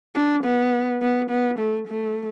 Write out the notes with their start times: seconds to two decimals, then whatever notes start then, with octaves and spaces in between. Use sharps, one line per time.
0.15 D4
0.44 B3
1.02 B3
1.30 B3
1.59 A3
1.88 A3